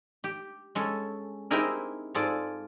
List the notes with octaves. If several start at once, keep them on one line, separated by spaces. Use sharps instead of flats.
G4
G#3 C#4 A4
C4 D#4 E4 G4 G#4 A#4
G#2 F4 G#4 A4 D5